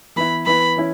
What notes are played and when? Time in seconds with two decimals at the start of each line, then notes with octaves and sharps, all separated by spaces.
0.16 E3 B3 E4 B5
0.46 E3 B3 E4 B5
0.77 E3 C#4 E4